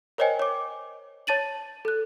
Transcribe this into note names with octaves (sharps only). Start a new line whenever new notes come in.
A#4 C5 C#5 D#5 G5 G#5
C#5 D6
C#5 A5 A6 D#7 F#7
A4 F#6